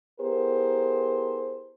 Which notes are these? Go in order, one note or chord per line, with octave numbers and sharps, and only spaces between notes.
B3 E4 G4 G#4 A#4 C5